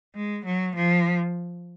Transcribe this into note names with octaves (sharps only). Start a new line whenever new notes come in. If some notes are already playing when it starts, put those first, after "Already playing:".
G#3
F#3
F3